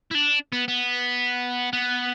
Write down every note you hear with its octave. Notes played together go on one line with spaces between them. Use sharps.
E4
D4
B3
B3
B3